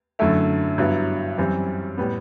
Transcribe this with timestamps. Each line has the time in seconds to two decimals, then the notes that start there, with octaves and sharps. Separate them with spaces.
0.19 F#2 D3 A3 E4
0.78 G2 F#3 B3 E4
1.38 F#2 E3 G3 C4
1.98 A2 G3 B3